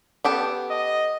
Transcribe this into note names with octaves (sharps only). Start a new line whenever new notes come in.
B3 G4 A4
D#5